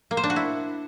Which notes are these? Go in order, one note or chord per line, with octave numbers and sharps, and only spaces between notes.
A#3
C5
D4
F#4
E4